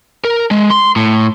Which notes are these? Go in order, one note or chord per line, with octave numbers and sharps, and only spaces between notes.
A#4
G#3
C6
A2